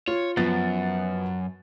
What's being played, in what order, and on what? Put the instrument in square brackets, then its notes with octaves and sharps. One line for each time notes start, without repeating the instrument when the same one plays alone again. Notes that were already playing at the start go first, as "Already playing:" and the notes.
[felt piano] F4 [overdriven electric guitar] C#5
[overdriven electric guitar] F#2 [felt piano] F3 B3 A6